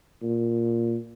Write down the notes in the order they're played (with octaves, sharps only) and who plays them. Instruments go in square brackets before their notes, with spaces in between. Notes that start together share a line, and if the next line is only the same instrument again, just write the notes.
[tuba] A#2